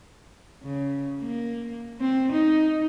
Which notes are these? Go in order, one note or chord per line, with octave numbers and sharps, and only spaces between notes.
C#3
A#3
C4
D#4